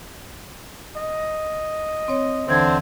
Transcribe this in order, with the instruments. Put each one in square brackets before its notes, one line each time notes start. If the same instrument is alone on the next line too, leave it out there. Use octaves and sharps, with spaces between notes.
[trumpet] D#5
[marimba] C4 C#5
[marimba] D#2 E3 G#6 [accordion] D3 C4